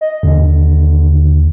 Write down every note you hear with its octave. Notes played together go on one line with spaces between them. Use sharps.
D#5
D#2 D3